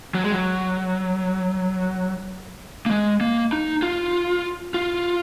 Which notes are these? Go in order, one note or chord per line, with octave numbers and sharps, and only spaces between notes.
F#3
G#3
F#3
A#3
G#3
A#3
D#4
F4
F4